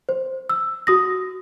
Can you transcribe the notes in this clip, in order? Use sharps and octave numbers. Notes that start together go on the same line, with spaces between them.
C5
E6
F#4 D#6 A#6